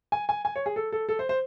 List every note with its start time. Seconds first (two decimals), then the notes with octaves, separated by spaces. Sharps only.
0.12 G#5
0.29 G#5
0.45 G#5
0.56 C#5
0.66 G#4
0.76 A4
0.92 A4
1.09 A4
1.19 C5
1.29 C5